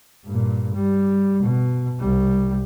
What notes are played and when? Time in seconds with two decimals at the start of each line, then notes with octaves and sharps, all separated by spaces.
0.25 G2 A#2
0.74 G3
1.43 B2
1.99 C2 G3